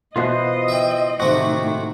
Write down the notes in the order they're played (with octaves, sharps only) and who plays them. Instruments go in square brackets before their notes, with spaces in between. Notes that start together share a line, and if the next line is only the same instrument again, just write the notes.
[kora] B2 E3 B3 [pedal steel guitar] F4 C5 F#6 [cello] D#5
[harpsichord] E5 G5
[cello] A2 D#3 [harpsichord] C3 A3 C4 [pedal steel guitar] F#4